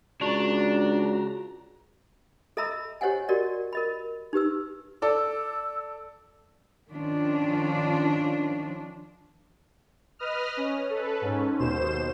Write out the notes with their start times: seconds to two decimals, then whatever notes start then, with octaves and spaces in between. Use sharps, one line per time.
0.21 C#2 D4 F#4 A#5
2.57 A4 D#5 E5 A#5 B5 E6
3.01 G4 C5 C#5 D#5 F#5 G#5
3.29 F#4 G4 A#4 D5 D#5
3.73 A#4 D#5 B5
4.33 D#4 G4 B4 E6
5.02 A4 D5 E6
6.90 D#3 F3 C#4 D4 F4
10.19 B4 D#5 D#6 F6
10.57 C#4
10.90 A4 B4
11.21 G#2 C#4
11.59 D#2 B2 C5 E7